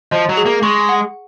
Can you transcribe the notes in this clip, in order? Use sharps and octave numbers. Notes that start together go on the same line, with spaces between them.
F3 D#5
F#3
G#4
A#3
G#3 C#6
F#5